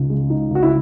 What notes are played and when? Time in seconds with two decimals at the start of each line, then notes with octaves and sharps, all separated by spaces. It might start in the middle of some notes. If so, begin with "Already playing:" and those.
Already playing: C#2 C#3 D#4
0.10 G#3
0.30 D#4
0.51 C#2 F#4
0.63 E4